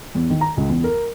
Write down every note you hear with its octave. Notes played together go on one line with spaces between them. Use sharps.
E2
D#3
A#5
C#2
E2
A#4